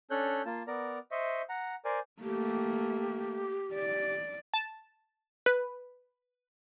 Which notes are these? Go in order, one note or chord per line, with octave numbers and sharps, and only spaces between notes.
C#4 D4 A4 C#5 F#6 G6
A#3 F4 A5
B3 A#4 D5 A#5
C5 D#5 E5 C#6
F#5 A#5
A#4 C5 D5 G#5
A3 A#3 G4
D5
A5
B4